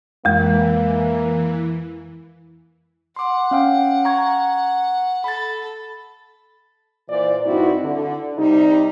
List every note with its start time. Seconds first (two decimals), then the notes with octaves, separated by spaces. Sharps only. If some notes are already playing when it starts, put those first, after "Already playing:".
0.25 F2 E3 G#3 A#3
3.16 F#5 C6 D6
3.51 C#4 F5 G5
4.05 A#5 C#6 G#6
5.24 A4 B5 A6
7.09 A#2 E3 C5 D5
7.46 G2 C4 D#4 E4 F#4
7.83 D3
8.38 C3 G3 D#4